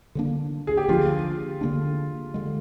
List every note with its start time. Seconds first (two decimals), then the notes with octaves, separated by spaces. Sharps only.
0.15 D3 F3 A#3 D4
0.67 G#4
0.77 G4
0.89 D3 F3 A#3 D4 F4
1.61 D3 F3 A#3 D4
2.34 D3 G#3